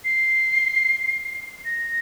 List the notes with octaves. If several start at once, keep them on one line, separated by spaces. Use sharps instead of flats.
C7
A#6